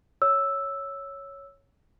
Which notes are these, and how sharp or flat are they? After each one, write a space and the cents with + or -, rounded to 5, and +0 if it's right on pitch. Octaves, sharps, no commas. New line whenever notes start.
C#5 +0 E6 +0